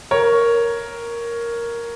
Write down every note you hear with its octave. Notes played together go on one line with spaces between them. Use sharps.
A#4 C#5